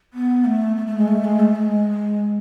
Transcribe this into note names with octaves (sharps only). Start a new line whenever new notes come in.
B3
A3
A3
A3
G#3
A3
G#3
A3
G#3